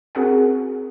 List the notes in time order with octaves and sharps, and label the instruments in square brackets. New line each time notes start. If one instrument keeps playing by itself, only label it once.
[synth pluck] C4 F#4 G#4 A#4 F#5